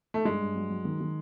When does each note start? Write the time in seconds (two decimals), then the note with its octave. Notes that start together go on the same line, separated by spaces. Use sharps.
0.14 A3
0.25 G2 G#3
0.40 G2
0.55 F#3
0.70 F#3
0.85 D#3
1.00 D#3